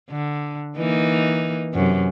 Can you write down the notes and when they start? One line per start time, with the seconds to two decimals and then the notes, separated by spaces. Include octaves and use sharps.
0.10 D3
0.76 E3 A#3 D#4
1.74 F#2 C3